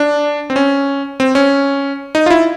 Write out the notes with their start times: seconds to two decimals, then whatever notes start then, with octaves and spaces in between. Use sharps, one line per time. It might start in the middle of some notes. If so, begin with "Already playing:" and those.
Already playing: D4
0.50 C4
0.56 C#4
1.20 C4
1.35 C#4
2.15 D#4
2.26 F4
2.30 E4